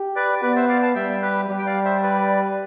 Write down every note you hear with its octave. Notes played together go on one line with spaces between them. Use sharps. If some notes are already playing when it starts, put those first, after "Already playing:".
Already playing: G4
B4 D5
B3 B4 D5
C5 E5
D5 F5
F5 A5
G3 E5 G5
G4 B4
G3 G4
G5
D5 F5
C5 E5
B4 D5